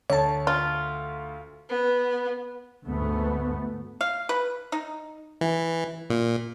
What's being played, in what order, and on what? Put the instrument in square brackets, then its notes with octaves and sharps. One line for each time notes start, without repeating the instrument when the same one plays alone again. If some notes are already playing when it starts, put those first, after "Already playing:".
[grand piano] D2 [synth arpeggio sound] C#5 A5
[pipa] F4
[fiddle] B3
[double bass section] D2 G#2 A3 B3
[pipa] F5
B4
D#4
[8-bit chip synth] E3
A#2